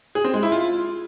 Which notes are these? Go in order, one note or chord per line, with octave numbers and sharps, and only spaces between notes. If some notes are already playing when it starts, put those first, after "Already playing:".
G#4
C4
G#3
E4
F4